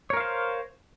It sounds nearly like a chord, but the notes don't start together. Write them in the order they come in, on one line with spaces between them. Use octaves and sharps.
C#5 A#4 F5 C5